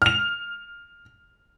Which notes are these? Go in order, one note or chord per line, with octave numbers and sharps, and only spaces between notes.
F6 F7